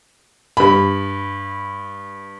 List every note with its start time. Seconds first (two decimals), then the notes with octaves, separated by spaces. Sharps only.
0.57 G2 B5